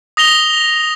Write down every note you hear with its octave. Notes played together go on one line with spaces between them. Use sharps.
D#6 A#6 F7 G7